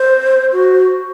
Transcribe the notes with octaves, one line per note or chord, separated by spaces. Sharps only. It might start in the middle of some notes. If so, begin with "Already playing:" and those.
Already playing: C5
F#4